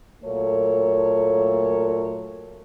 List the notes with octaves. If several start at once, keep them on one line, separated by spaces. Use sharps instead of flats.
A#2 F#3 A3 A#3 A4 C#5